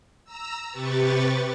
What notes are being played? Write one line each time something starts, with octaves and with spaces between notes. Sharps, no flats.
A#5 E6
C3 G4 B4 C#6 A6